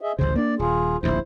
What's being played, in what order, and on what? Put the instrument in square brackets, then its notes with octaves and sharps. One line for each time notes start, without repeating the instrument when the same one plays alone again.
[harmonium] G#4 D#5 E5
[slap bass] A1 D2 C#3 [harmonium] C5
[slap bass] A#3 D4 [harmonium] D5
[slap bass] D#1 [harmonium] F4 G#4
[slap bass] D1 A#1 D#2 [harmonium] E4 C5